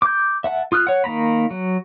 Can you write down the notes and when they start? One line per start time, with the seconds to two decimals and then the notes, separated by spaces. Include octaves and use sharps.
0.02 D6 G6
0.44 E5 F#5 A5
0.72 F4 D#6 F6 F#6
0.87 C#5 F#5
1.04 D#3 A#3 A#5 B5
1.51 F#3